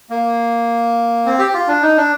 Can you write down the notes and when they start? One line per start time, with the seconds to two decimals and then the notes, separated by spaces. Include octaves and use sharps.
0.10 A#3
1.26 C4
1.39 G4
1.54 F4
1.68 D4
1.82 D#4
1.97 D4